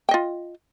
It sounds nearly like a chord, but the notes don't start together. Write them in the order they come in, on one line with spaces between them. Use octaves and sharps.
G5 D#5 F4